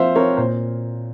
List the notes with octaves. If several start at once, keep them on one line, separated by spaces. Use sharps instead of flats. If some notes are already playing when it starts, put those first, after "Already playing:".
Already playing: F3 A#3 C4 C5 E5 F5
C4 A#4 C#5
A#2 C5